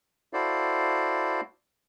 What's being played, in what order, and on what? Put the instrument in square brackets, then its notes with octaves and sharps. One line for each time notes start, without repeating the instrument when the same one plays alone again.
[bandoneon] E4 F#4 A4 C5 D5 F5